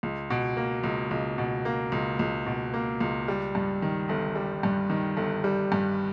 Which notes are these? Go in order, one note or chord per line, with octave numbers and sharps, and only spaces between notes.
C#2
B2
A#3
C#2
C#2
B2
A#3
C#2
C#2
B2
A#3
C#2
G3
G2
D#3
G1
G3
G2
D#3
G1
G3
G2